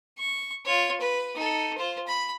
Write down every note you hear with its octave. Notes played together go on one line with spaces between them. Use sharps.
C#6
F4 C#5
B4
D#4 A4
F4 C5
B5